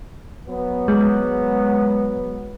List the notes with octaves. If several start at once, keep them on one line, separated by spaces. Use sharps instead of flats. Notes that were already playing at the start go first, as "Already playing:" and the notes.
F#3 B3
G#3